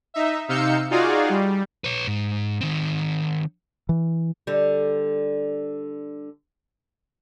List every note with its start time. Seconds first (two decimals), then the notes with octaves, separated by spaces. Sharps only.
0.14 D#4 E5
0.48 C3 D#4 F5 E6 G6 C#7
0.91 D#4 F4 F#4 G#4 D5 F5
1.29 G3
1.84 B4 C#5
2.07 G#2
2.61 D#3 C4
3.89 E3
4.47 D3 G3